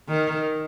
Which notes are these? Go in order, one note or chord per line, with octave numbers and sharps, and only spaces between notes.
D#3